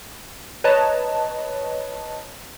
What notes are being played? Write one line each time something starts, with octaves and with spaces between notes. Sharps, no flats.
B4 C#5 D#5 A5 A#5